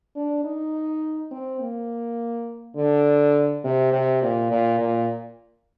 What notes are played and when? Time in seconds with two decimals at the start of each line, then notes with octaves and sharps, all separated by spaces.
0.16 D4
0.44 D#4
1.31 C4
1.60 A#3
2.76 D3
3.64 C3
3.92 C3
4.22 A#2
4.51 A#2
4.79 A#2